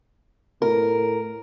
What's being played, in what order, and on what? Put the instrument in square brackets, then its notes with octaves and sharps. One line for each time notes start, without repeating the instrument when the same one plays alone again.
[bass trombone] A2 [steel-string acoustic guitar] A#4